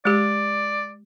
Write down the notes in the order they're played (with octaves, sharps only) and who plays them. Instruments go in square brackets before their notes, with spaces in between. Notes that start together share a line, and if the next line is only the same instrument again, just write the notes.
[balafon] G#3 G4 [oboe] D5